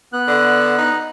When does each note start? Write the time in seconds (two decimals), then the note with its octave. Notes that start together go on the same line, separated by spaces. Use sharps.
0.13 B3 F#6
0.28 D3
0.78 D#4